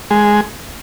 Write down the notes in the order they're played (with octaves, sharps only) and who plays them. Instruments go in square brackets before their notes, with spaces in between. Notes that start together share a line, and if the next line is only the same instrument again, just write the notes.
[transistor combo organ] G#3